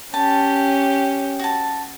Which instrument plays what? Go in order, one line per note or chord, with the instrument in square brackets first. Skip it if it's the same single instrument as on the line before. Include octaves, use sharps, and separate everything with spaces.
[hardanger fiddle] C#4 G4 [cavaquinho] A5
[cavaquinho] F#4 A5